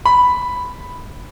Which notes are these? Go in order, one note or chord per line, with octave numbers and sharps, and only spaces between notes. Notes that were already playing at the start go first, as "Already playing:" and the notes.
B5